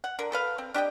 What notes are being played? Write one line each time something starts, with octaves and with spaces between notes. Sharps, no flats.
F#5
D3 A#4
A4 B4 F5
C4
D4 G4 D#5 G5